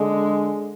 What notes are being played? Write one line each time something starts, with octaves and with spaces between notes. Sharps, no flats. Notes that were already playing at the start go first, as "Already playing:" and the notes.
Already playing: D3 G#3